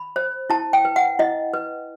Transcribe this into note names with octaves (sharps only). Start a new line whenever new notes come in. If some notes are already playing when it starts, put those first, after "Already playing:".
Already playing: B5
C5
E4 A5
G5
B4
F#5
E4 D#5
B4